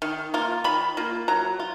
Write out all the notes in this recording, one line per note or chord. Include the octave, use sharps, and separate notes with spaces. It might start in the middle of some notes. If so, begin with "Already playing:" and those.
D#3
A#3 F4
D#3 B5
A#3 F4
F#3 A#5
F4